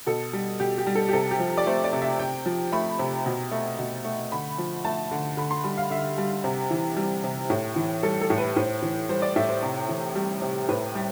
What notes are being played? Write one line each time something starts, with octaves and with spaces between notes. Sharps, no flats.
B2 A4
G3
B2 G4
G4
G3
A4
G4
C3 A4
G4
F3
D5
A3 C5
D5
C3
E5
C3 G5
F3
A3 B5
C3
B2
A3
B2
A3
D3 B5
F3
A3 A5
D3
D3 B5
C6
G3 B5
F5
D3 E5
G3
C3
E3
G3
C3
A2
E3
G3 A4
A4
A2
B4
A2 C5
E3
G3 C5
D5
A2 E5
C5
C3
E3
G3
C3
A2 B4
G3 G4